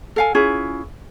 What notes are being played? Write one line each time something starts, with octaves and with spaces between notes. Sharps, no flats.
A4 F5 G#5
C#4 E4 F4 G#4